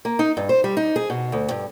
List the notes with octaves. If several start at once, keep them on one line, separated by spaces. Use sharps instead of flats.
A#3
D#4
G2
C5
G3
D#4
G#4
B2
D2
G2